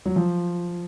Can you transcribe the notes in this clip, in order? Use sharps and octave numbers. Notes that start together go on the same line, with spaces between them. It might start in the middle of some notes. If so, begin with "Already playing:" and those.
F#3
F3